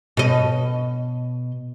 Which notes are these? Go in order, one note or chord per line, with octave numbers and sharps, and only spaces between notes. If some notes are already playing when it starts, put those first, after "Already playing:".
B2 D#5